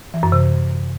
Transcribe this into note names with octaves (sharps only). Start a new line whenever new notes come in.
E3
F#2
C3